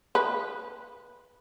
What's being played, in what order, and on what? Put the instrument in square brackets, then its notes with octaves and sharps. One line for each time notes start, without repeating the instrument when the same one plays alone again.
[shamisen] B4